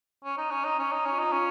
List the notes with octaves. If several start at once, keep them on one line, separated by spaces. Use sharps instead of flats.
C#4
D#4
C#4
D#4
C#4
D#4
C#4
F4
D#4
C#4